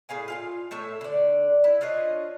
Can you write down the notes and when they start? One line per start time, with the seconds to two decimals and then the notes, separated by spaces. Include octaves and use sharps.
0.09 A2 G#4 F5 G#5
0.28 F4 E5 F5
0.71 A2 A3 C#5 E5
1.01 D3 D5
1.64 E4
1.81 D4 F4 C#5 D#5